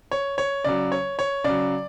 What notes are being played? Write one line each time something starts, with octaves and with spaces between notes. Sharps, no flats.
C#5
C#5
C#3 F#3 D5
C#5
C#5
C#3 F#3 D5